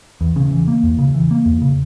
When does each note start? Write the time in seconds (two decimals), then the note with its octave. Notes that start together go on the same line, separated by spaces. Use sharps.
0.21 E2
0.36 C#3
0.51 E3
0.68 A#3
0.83 E2
0.98 C#3
1.14 E3
1.31 A#3
1.46 E2
1.62 C#3